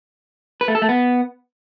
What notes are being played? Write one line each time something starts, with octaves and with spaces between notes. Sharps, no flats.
B4
A3
A4
A3
B3